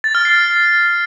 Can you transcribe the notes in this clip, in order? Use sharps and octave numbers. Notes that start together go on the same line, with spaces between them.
A6
F6
C7